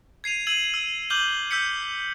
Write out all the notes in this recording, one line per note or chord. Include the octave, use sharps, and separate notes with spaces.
G#6 C7 D#7 F7
E6 G#6 D#7 F#7
E6
D6 F6 G6 F#7 G7
E6 G6 B6 C#7